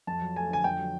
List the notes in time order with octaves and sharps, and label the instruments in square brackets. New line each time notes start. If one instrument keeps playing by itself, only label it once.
[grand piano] F2 A5
F#3
A3 G#5
D3 G#5
F2 G5
F#3